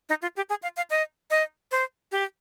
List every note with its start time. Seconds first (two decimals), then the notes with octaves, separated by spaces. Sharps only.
0.09 D#4
0.22 F4
0.37 G4
0.50 G#4
0.63 F5
0.77 F5
0.90 D#5
1.30 D#5
1.71 C5
2.12 G4